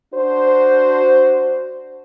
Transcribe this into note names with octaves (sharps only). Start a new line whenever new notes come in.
D4 F#4 C5